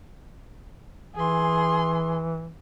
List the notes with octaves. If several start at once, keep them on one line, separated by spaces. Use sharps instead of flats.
E3 G#4 C6